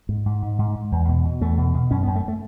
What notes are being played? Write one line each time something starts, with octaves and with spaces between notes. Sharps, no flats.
G#2
G#2
G#2
G#2
G#2
E2
B2
B2
E2 A3
B2
B2
F#2 C#4
B3
F#2
A3
A3